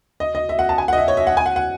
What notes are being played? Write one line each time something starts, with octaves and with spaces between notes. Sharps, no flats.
D#5
D#5
E5
F#5
A5
G#5
F#5
D#5
E5
C#5
E5
F#5
G#5
F#5
F#5